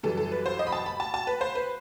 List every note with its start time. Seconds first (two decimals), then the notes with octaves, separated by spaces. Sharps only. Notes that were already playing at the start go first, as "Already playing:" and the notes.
0.03 F#2 E3 G3 A4
0.17 A4
0.32 B4
0.46 C5
0.59 D#5
0.67 B5
0.72 A5
0.86 B5
1.00 A5
1.14 A5
1.27 B4
1.41 C5
1.55 B4